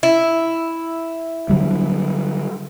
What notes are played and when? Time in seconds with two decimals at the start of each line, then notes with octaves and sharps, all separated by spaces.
0.03 E4
1.50 D3 F#3 G3